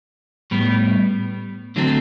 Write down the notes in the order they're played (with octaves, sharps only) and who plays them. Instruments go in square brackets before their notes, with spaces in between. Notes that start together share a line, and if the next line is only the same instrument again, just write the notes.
[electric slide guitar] A2 G3 B3
D3 F#3 A3 C4